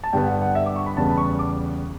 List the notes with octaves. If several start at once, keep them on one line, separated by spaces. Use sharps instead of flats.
A5
G2 D3 G3 B3 G5
F#5
F#5
E5
D6
C#6
B5
E2 C#3 G3 B3 A5
B5
C#6
D6